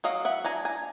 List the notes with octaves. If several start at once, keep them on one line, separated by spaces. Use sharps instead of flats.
F#3 D#5 F5
E5 F#5
D4 G#5 A#5
G#5 A#5